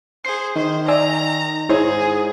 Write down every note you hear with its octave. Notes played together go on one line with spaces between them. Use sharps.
G#4 C5 C7
D#3 C5
D5 E5 G#5 A#5
G#2 E4 G#4 C5 C#5